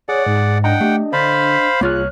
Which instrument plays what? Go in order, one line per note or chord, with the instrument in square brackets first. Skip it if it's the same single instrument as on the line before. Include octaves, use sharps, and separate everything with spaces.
[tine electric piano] G#4 [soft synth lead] C#5 [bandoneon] D5 F#5
[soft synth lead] G#2
[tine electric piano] D4 D#5 [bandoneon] F#5 G5 [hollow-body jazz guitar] A#5
[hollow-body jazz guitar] A3 [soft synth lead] G4
[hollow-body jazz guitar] D3 [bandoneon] C5 F5 B5 [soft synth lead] B6
[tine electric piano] C2 C#5 F6 [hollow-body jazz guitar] A#3 F4 G#4 [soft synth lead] F#6